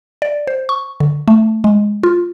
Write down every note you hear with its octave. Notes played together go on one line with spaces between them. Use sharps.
D5
C5
C#6
D3
A3
G#3
F4